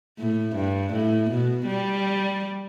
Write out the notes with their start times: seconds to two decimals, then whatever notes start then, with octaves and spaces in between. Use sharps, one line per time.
0.19 A2
0.56 G2
0.93 A2
1.30 B2
1.67 G3